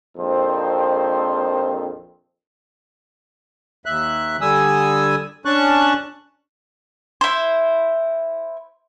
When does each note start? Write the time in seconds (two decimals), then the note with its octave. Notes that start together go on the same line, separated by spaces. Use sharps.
0.17 A#1 F2 D#3 C4 C5
3.86 D#2 E5 F#6
4.41 D3 G3 G#5 D#6 E6
5.45 C#4 D4 A5 C#6 F#6
7.21 E4 C5